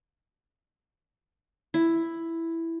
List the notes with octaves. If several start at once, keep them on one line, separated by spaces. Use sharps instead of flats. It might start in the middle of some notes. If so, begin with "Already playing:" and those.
E4